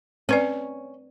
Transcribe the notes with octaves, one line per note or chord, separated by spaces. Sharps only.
C4 C#4 B4 D5